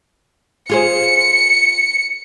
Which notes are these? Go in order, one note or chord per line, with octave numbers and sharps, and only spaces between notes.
F4 G#4 C5 C#7